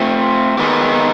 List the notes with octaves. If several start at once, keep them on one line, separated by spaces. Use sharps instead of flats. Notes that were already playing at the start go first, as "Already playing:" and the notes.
Already playing: A3 C4 F4
D#3 G#3 B3 D#4 G4